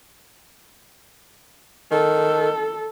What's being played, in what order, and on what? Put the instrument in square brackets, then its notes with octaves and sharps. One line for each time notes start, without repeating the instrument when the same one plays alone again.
[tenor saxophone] D#3 [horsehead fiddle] A4